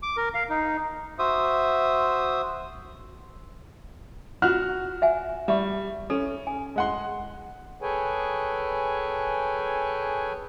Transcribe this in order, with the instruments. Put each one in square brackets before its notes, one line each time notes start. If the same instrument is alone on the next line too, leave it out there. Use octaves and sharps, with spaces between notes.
[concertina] D6
A#4
F5
D#4
F#4 C5 E5 D#6
[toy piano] F4 F#5 [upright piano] F#4 F6 F#6
[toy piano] E5 F#5 G#5
[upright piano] G3 [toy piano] E5 C#6
[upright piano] C#4 [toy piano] A4
[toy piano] G#5
[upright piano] G#3 F#5 C6
[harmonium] G#4 A4 B4 C#5 G5 G#5